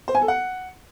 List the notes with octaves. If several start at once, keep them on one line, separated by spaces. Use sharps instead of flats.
C5
G#5
A4
F#5